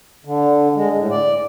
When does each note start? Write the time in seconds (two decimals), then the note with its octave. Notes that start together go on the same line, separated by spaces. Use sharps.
0.25 D3
0.76 G#3
0.96 A2
1.10 D5